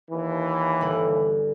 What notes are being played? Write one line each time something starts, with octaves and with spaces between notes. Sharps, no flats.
D#2 E3
G1 D3 B5